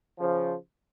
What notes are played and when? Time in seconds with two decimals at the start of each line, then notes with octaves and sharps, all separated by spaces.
0.19 C#3 F3